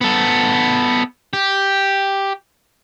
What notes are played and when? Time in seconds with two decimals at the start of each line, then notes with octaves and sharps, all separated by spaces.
0.01 B3 A4
1.33 G4